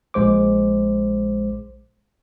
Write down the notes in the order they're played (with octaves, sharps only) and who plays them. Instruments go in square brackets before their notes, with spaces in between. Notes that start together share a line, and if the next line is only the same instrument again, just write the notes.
[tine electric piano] A#1 G#3 C5 D6